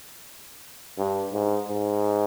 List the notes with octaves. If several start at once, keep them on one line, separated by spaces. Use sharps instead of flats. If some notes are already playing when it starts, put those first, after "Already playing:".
G2
G#2
G#2